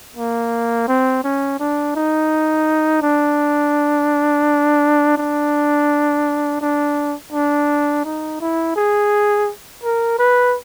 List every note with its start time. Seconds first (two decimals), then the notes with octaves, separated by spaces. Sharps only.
0.17 A#3
0.88 C4
1.24 C#4
1.60 D4
1.96 D#4
3.02 D4
5.17 D4
6.61 D4
7.33 D4
8.05 D#4
8.40 E4
8.76 G#4
9.83 A#4
10.19 B4